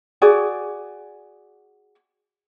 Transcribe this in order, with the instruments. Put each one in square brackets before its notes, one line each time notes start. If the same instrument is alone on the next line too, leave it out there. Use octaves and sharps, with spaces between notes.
[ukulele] F#4 G#4 D5